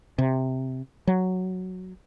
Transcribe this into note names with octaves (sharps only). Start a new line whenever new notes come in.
C3
F#3